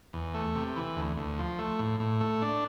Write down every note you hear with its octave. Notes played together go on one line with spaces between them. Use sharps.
E2
A3
C3
E3
D2
D2
F3
A3
A2
A2
A3
D4